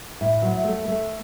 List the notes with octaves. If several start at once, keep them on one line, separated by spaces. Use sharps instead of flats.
A2
F#3
A3
A3